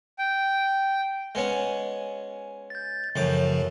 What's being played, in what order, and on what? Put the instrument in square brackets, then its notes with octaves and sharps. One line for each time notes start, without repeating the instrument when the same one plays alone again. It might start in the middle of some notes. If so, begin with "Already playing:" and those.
[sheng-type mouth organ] G5
[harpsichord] G#3 B3 C#4
[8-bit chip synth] G6 A6
[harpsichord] F#2 A2 D6 [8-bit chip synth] C#3 E3 F3